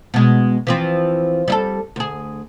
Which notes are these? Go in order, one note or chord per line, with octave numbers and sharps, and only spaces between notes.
B2 G#3
E3 F3 C4
G3 E4 A4
D2 G#4